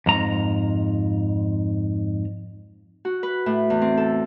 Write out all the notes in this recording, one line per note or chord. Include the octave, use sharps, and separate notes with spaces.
F2 G#2 A#5
F#4
B4
A2
E2
C4
A4